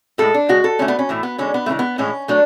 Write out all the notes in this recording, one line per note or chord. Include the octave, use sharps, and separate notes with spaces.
A2 G#3 A4
D4
C#3 G#3 F#4
A4
D3 A3 C#4
B3
C#4
A2 E3 A3
B3
D3 G#3 C#4
B3
A3
C#3 E3 G#3
B3
A2 E3 G#3 C#4
F#3 A3 D4